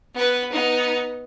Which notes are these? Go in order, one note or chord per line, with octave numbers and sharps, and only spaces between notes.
B3 B4
B3 D#4